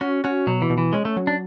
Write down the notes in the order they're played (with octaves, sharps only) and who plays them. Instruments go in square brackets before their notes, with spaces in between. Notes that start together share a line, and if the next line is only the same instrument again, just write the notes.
[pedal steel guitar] C#4 [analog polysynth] F#4
[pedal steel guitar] C#4 [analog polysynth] F#4
[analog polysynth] B2 [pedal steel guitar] F#3
[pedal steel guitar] E3
[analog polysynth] B2
[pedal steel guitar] E3
[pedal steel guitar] G#3 [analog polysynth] C#4
[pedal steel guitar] A3
[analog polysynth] F#3
[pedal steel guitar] D4